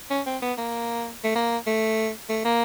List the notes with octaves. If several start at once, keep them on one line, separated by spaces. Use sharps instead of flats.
C#4
C4
B3
A#3
A3
A#3
A3
A3
A#3